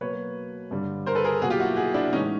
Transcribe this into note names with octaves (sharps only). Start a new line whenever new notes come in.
B2 F#3 A#3 B4 C#5
G2 D3 G3
A#4 C5
A4 B4
G#4 A#4
B2 F#3 A#3 F#4 G#4
F4 G4
E4 F#4
F#4 G#4
D4 E4
A2 E3 G#3 C#4 D#4